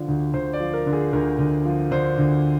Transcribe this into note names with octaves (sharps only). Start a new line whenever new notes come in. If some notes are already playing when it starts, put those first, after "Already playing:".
Already playing: D3 F3
D2
D2 C5
D5
F3
A#4
D3
G#4
D2 A#4
D2
F3
D3 C5
D2